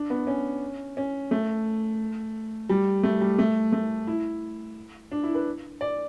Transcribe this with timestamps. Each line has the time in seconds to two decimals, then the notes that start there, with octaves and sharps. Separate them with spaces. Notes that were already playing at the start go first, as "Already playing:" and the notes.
Already playing: D4
0.10 B3
0.27 C#4
0.97 C#4
1.31 A3
2.69 G3
3.03 A3
3.21 G3
3.39 A3
3.72 A3
4.07 E4
5.11 D4
5.23 E4
5.34 B4
5.81 D5